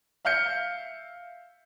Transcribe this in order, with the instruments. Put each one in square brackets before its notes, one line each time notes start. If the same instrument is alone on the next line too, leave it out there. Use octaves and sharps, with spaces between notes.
[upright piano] E5 F5 F6 G6 C#7